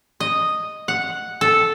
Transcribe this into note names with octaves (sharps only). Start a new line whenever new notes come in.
D#5
F#5
A4